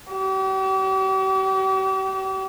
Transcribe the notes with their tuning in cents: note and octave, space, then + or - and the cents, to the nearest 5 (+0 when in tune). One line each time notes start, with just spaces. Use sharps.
G4 -40